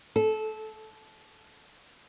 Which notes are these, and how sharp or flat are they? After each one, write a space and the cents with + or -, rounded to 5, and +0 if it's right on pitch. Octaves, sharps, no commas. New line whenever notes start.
A4 -20